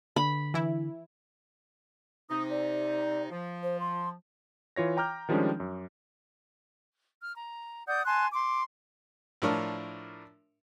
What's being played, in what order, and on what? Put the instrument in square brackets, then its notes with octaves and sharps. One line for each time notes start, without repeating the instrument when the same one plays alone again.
[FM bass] D3 [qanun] B5
[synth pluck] E3 E4
[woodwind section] C3 D#4 [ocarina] D#6
[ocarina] D5
[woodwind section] F3
[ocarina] C5
C6
[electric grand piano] E3 F4 C#5 A#6
G5 A#5 D6 F6 G6
D#3 F3 G3 G#3 C#4 D4
F#2
[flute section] F6
A#5
D5 F#5 D#6 G6
G#5 A5 C6 F#6
C6 D6
[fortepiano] A2 F3 D4 A#4 C#5